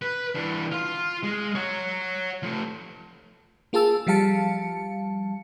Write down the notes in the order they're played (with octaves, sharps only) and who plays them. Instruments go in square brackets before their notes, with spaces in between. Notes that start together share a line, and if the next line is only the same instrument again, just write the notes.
[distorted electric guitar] B4
E3 D4
F4
G#3
C#5 F#5
F3 A3
[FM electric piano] A#3 F4 G#4 A5 E6
F3 G3 F5 A5 C#7